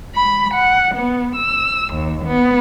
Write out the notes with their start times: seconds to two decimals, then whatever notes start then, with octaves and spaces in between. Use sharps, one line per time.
0.16 B5
0.55 F#5
0.95 B3
1.36 E6
1.94 D#2
2.26 B3